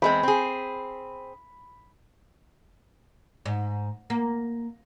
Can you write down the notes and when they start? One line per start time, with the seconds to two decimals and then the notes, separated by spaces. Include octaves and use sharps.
0.02 E2 G#3 C4 B5
0.23 C4 G#4
3.46 G#2
4.10 A#3